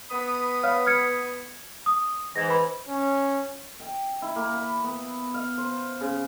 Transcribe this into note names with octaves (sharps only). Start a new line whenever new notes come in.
B3 B5 D#6
C#5 F5 F6
F6 G#6 C#7
D#6
G#2 E3 G#6 A#6
B4 B5
C#4
G5
E4
A#3
B5
B3
F5
C5
C#3